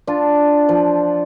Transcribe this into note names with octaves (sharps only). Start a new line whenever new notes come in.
D4 F4
F3